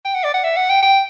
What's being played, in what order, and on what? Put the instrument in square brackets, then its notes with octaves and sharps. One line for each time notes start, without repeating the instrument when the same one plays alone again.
[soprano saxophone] G5
F#5
D5
F#5
E5
F#5
G5
G5